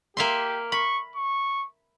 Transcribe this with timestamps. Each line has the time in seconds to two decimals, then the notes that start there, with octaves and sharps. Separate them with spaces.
0.17 A#3 G4 E5 C6
0.72 B5 C#6
1.16 C#6